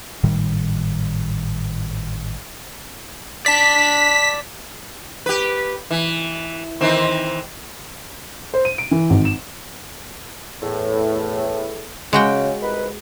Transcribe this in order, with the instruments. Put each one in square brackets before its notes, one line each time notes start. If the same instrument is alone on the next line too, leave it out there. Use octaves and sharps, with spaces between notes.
[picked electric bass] G#1 A2 D#3 G3
[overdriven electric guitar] D5 A5 [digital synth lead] B6
[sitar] G4 B4
E3
D#3 E3 C4
[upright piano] C5
D#7
D7
E3
G#1
E7
[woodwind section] E2 A2
[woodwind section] C#3 [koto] G#3 F#4 G5
[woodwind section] C2 D#4 B4